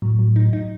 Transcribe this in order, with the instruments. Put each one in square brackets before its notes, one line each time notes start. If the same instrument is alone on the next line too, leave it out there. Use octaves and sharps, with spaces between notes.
[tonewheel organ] A2 [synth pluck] F#3
[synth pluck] F#3
D#4
D#4